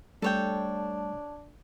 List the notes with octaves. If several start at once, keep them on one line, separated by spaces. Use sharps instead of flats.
G3 A3 D4 A4 C#5 G5